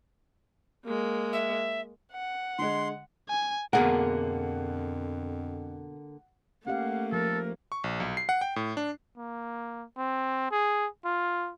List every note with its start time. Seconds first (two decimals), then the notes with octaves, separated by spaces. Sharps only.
0.85 G#3 A#3
1.33 E5
2.13 F#5
2.59 D3 G#3 C6
3.29 G#5
3.73 F2 B2 D3 A#3 G#4 A#4 F#5
6.67 A3 A#3 C#4 G4 F5 F#5
7.12 F3 A4 A#4
7.72 C#6
7.84 A#1
8.00 B1
8.17 C7
8.29 F#5
8.41 G5
8.56 A2
8.77 D4
9.17 A#3
9.97 C4
10.51 G#4
11.05 F4